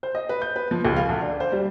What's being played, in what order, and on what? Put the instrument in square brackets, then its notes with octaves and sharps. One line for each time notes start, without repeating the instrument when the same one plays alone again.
[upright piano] C5
D#5
B4
G6
B4
F3
C#2
F5
D2
D4
C5
G3